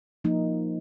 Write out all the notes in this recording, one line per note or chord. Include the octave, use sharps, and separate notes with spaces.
F3 A#3 D#4